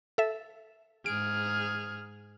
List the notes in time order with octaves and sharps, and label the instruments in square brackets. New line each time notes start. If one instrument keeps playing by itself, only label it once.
[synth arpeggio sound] A4 E5
[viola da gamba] G#2 G#4 [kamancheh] F6 [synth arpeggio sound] D7